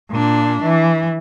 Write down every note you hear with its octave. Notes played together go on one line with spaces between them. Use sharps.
A#2 D4
E3